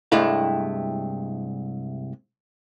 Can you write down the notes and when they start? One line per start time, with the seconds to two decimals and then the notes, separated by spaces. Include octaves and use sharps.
0.12 C2 G2 G#3 A3 E4 F5